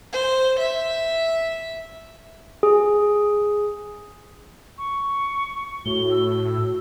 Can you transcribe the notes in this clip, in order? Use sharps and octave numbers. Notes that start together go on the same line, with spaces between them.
C5
E5
G#4
C#6
A2 F#4 G7
E6